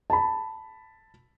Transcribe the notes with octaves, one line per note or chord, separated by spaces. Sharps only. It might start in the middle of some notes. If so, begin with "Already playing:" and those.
A5 B5